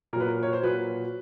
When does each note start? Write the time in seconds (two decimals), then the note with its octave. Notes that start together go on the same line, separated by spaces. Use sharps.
0.13 A#2 A#4
0.16 F#3 B4
0.26 A#4
0.43 C#5
0.53 C5
0.63 A#2 F#3 B4